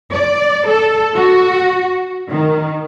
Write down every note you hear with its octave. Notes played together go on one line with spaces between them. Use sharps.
D5
A4
F#4
D#3